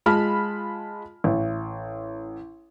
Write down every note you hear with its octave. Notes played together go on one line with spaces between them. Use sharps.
G#3 F4 A5 B5 F6
A1